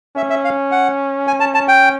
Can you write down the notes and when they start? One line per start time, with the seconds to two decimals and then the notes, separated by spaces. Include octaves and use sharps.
0.16 C#4 E5
0.30 E5
0.45 F5
0.71 F#5
1.27 G#5
1.40 A5
1.54 A5
1.68 G5